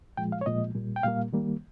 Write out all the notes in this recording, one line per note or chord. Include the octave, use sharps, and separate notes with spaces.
A#2 F3 G#3 G5
F5
C#5
A#2 F3 G#3 D#5
A#2 G3 A#3
G5
A#2 G3 A#3 F5
D#3 G3 A#3